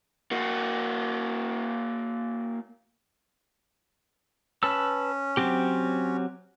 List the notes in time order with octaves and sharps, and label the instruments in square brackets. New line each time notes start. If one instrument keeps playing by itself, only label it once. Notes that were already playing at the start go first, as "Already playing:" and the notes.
[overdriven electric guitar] A#3 F#4
[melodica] C#4 [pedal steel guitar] B4 A5 E6
[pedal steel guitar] F#3 C4 G4